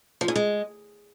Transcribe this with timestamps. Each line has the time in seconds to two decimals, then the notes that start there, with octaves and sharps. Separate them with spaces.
0.21 F3
0.28 G#2
0.36 G#3